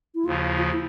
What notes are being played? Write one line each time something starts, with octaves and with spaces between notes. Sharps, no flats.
E4
D#2 C#3 F3 F4
F4
E4